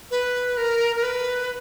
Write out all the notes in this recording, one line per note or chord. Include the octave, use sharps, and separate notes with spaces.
B4
A#4
A#4
B4